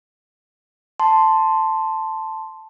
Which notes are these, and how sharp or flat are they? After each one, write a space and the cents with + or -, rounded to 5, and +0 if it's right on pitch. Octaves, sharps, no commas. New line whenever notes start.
A5 +0 C6 +0